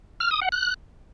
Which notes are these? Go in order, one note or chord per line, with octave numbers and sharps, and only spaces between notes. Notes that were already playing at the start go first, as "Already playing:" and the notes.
F6
D#6
F#5
F#6